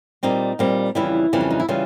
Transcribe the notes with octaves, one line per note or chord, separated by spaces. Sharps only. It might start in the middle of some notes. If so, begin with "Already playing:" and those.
A#2 G3 C4 D#4
A#2 G3 C4
F2 C#3 E3 G3 E4
F2 C#3 E3 G3
D4
D#4
E4
C#3 E3 G3 F4